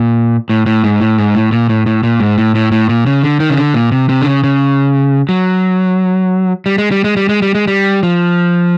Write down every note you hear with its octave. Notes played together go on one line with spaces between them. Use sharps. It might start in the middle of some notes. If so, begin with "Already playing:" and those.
Already playing: A#2
A2
A2
G#2
A2
G#2
A2
A#2
A2
A2
A#2
G#2
A2
A2
A2
A#2
C#3
D3
D#3
C#3
D3
A#2
C3
C3
D3
C#3
C#3
F#3
G3
G#3
G3
G#3
G3
G#3
G3
G#3
G3
F3